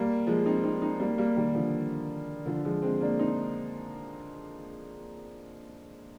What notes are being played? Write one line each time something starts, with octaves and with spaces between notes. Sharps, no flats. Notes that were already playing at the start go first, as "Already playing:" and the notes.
Already playing: G3 A#3
F3 G#3
C4 D#4
C4 D#4
C4 D#4
G3 A#3
G3 A#3
D#3 G3
D3 F3
D3 F3
F3 G#3
G#3 C4
A#3 D4
C4 D#4